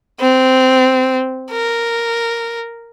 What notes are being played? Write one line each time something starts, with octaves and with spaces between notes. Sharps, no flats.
C4
A#4